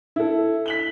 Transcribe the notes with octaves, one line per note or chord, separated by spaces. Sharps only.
E4 A4
B6 F#7 G7